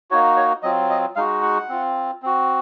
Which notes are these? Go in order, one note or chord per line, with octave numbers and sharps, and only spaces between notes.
A#3 D#4 F#4 C#5
C#5
F#3 C4 F4 D#5
D#5
G#3 D#4 F#4 F5
F#5
C4 F4
C4 F#4